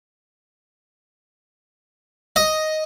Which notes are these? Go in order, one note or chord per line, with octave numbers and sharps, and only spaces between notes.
D#5